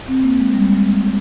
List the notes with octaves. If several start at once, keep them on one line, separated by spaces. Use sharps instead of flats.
C4
A#3
G#3
G3
G#3
G3
G#3